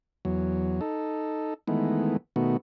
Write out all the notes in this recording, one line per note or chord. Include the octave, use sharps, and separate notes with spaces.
E2 F#3
D#4 A4
D#3 E3 G#3 A3 B3
B2 D#3 A3 B3 F#4